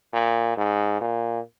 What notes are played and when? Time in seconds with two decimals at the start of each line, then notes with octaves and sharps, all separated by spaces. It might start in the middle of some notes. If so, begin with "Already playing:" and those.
0.13 A#2
0.57 G#2
1.01 A#2